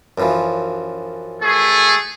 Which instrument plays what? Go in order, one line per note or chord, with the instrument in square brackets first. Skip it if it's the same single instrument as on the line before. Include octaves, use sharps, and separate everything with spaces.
[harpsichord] F#2 E3 F3
[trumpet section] A3 G#4